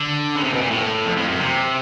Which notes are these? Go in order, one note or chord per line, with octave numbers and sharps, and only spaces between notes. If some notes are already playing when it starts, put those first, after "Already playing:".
Already playing: D3
C#3
C3
B2
A#2
A2
F2
F2
F#2
C3